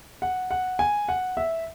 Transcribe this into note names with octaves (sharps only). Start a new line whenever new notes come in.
F#5
F#5
G#5
F#5
E5